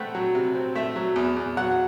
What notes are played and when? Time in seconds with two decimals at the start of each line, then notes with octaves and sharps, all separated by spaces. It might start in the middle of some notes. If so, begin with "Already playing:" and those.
Already playing: A3 C4 F#5 G5 B5
0.15 F#3
0.35 C3
0.55 C4
0.75 A3 E5
0.96 F#3
1.16 E2
1.37 E2
1.57 F#3 F#5